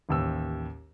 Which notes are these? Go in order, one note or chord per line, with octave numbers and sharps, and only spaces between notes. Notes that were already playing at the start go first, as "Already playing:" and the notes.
A1 D#2 E6